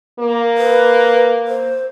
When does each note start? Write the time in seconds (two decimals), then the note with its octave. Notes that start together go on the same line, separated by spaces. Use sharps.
0.19 A#3
0.58 B4
1.48 C5